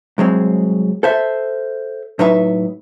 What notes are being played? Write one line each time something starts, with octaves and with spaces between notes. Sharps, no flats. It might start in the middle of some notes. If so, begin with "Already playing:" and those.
C2 F#3 G#3 C4
A4 C5 E5
A2 F#3 D#4 B4 E5